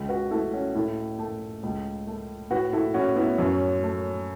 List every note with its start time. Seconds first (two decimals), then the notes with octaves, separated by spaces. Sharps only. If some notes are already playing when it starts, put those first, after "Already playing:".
Already playing: C#2
0.09 F#4 B4
0.31 A3 E4 A4
0.53 C#4 F#4
0.75 A2 E4 A4
1.19 A3
1.63 C#2
2.07 A3
2.50 A2 F#4 B4
2.73 E4 A4
2.94 A2 C#4 F#4
3.16 B3 E4
3.38 F#2 C#4
3.83 A3